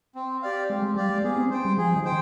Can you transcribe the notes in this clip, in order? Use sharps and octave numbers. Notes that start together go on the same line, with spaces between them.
C4
G4 D5 F5
G#3 C4
G#3
G3 G4 D5 F5
G#3
B3 G#4
C4
C5 G5
G3
F3 G#4
D#3
C5 G5